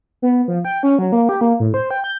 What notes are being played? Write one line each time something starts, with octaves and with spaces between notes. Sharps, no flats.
B3
F3
G5
C#4
F#3
A#3
G4
A#3
A2
C5
G5
G6